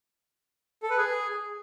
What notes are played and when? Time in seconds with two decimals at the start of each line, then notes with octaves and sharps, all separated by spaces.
0.83 A4
0.90 B4
0.98 G#4